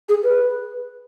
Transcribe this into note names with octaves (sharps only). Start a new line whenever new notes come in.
G#4
B4